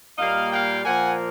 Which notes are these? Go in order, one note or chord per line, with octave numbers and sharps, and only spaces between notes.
A#2 G3 A#3 D#5 F5
F5 G5
A#2 F3 A#3 F#5 G#5